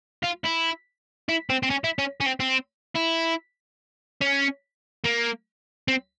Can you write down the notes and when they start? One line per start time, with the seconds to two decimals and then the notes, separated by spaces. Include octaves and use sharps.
0.24 F4
0.45 E4
1.29 E4
1.50 C4
1.63 C4
1.70 C#4
1.84 E4
1.99 C#4
2.21 C#4
2.26 C4
2.40 C4
2.96 E4
4.21 C#4
5.04 A#3
5.88 C4